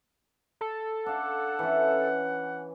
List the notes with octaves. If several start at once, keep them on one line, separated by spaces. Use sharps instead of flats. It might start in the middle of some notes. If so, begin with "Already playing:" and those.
A4
D4 F5 F#5
E3 C#4